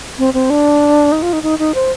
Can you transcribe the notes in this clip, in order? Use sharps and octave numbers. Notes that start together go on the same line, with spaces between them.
C4
C4
D4
D#4
F4
D#4
D#4
D#4
C5